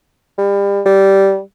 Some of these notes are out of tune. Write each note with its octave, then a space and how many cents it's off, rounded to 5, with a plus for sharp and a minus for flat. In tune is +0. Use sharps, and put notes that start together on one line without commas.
G3 +30
G3 -10